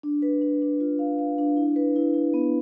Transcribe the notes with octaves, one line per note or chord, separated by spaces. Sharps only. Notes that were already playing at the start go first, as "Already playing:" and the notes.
D4
B4
D4
D4
F4
F5
F5
D4
E4
B4
E4
E4
B3